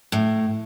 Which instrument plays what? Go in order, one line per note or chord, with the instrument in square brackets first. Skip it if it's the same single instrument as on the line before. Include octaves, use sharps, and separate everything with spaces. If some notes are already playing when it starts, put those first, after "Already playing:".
[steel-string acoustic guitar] A2